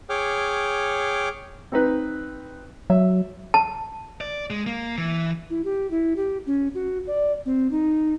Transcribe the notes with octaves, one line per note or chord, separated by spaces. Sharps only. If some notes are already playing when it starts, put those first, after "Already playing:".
G#4 C#5 G5 D6 F6
C4 D#4 B4
F#3 E5
A5
D5
G#3
A#3
E3
E4
G4
E4
G4
C#4
F#4
D5
C4
D#4